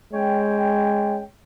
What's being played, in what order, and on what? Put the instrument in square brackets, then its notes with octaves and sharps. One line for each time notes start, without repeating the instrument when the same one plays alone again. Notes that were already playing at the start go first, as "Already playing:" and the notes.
[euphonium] G#3 [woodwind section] C#4 C#5 G5